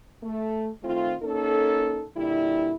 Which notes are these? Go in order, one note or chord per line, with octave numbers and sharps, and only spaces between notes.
A3
D#3 A3 C4 F4
A#3 C#4 D#4 A4
A#2 D3 G3 E4